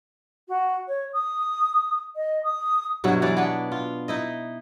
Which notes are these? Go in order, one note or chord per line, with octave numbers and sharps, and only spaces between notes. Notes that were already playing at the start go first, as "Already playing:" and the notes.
F#4
C#5
D#6
D#5
D#6
G2 B2 F#3 E4
E3 F#3 D5
B3 D4
F4
D#4 E4 D#5